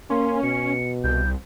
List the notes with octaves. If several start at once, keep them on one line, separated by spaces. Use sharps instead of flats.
A#3 C#4 C6
B2 C#7
C2 G6